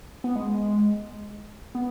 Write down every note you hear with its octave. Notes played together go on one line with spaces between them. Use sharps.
B3
G#3
B3